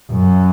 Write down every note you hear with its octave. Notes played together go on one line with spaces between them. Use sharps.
F#2